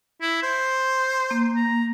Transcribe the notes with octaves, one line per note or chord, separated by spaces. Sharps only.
E4
C5
A#3
A#5